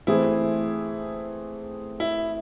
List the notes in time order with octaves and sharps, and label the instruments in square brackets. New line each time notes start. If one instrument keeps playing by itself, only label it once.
[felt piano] E3 A3 C4 G#4 [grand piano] E4
[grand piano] E4